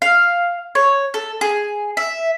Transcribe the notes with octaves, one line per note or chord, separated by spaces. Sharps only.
F5
C#5
A4
G#4
E5